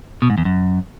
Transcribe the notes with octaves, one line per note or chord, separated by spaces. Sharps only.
B2
G#2
E2
F#2